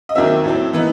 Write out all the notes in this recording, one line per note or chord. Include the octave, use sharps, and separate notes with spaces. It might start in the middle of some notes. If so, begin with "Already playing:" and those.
D#5
D#2 D#3 F#3 C4 E5
A2 F#3 C4
E3 B3 D#4